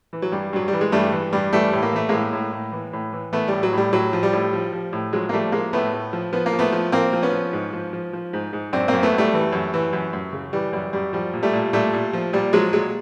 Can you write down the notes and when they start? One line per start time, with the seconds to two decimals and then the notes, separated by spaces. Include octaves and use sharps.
0.13 E3
0.22 F#3
0.32 G2 G3
0.53 G2 F#3
0.68 G3
0.73 E3
0.81 G#3
0.92 G2 G3 A3
1.13 E3
1.33 G2 G3
1.52 E3 G3 A3
1.73 A2
1.83 A#3
1.93 E3 A3
2.09 A2 G#3 A#3
2.33 A2
2.53 A2
2.72 E3
2.93 A2
3.13 E3
3.32 E3 A3 B3
3.48 A2 G3
3.63 F#3
3.73 A2 G3
3.93 A2 F#3
4.13 F3
4.23 G3
4.33 A2
4.53 F3
4.73 F3
4.93 A2
5.13 F3 F#3 G#3
5.29 A#3
5.33 F3 G3 A3
5.52 F3 G#3 A#3
5.73 A2 A3 B3
5.92 A2
6.13 F3
6.33 F3 B3
6.46 A#3
6.53 F3
6.59 A3 B3
6.73 F3
6.92 F3 A#3 C4
7.13 F3
7.23 B3 C#4
7.33 F3
7.53 G#2
7.73 F3
7.93 F3
8.13 F3
8.33 G#2
8.53 G#2
8.73 F#2 C4 D4
8.88 A#3 C4
8.93 F#2
9.03 A3 B3
9.13 F#2 G3 A3
9.34 E3
9.52 F#2
9.74 E3
9.93 F#2
10.13 F#2
10.33 C#3
10.53 E3 G3
10.73 F#2 G3
10.93 F#2 G3
11.13 F3 G3
11.33 A#2
11.43 G3 A3
11.53 A#2
11.73 A#2 G3 A3
11.93 A#2
12.13 F3
12.33 A#2 G3
12.53 F3 F#3 G#3
12.73 A#2 F#3 G#3